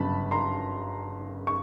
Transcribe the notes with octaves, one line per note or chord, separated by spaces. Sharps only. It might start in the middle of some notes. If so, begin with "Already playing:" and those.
Already playing: G1 F#2 C#3 A5 B5
A#5 C6
C#6